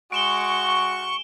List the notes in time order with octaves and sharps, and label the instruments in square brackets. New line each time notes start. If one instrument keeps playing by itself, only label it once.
[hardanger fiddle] G#3 [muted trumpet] F#4 [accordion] C#6 [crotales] D7 E7 G7